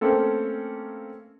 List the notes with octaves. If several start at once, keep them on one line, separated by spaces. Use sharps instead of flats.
A3 A#3 C4 C#4 A4